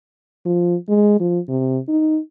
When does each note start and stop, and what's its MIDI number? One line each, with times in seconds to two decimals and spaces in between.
0.46 0.76 53
0.89 1.19 56
1.20 1.39 53
1.49 1.79 48
1.88 2.19 63